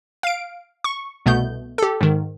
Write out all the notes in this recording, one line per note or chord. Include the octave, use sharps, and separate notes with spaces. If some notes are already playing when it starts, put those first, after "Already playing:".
F5 D7
C#6
C2 B2 A3 B3 G6
G4 A4
G#2 D#3